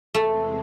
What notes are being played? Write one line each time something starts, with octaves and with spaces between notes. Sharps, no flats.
E2 C3 E3 G#3 A3 C4